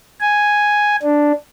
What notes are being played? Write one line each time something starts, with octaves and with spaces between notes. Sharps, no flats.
G#5
D4